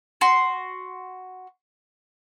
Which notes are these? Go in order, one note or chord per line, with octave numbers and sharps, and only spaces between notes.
F#4 C6